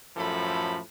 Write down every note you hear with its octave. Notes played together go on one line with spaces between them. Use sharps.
F#2 A2 F3 A4 B5